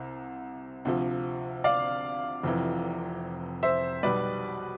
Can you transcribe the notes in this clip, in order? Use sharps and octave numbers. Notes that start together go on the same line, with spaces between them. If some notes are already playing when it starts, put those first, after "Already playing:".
Already playing: C2 C3
D2 C3 F3
D5 F5
F1 F2 C3 E3
C5 E5
B1 B2 G3 B4 D5